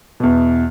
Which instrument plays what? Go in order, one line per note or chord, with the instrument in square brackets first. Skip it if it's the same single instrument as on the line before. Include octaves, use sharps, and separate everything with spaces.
[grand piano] E2 B2